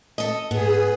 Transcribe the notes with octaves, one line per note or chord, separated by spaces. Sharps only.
A4 D#5
G#2 B3 G#4